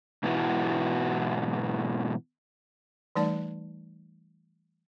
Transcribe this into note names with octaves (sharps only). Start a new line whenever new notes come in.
G#2 B2 E3 B3 E4 F#4
E3 G3 A3 D#4 D5 A5